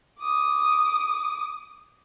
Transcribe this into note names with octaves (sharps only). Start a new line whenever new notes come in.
D6 D#6